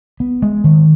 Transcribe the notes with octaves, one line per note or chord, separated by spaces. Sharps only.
B3
G#3
D#3